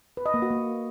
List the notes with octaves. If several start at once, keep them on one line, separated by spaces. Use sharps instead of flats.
B4
D#5
A#3
F#4
A#3